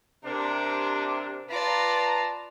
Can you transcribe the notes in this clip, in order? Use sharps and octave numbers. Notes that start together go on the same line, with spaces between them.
C3 D4 A#4
F4 B4 D5 A5 A#5